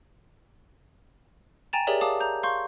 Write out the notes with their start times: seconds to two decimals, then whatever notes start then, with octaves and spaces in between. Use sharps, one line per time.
1.73 G5 G#5 A#5 A6 E7
1.87 G4 G#4 A#4 C#5 D5 E5
2.01 F5 A5 D6 D#6
2.20 A#5 G6
2.43 F5 C6 C#6 G6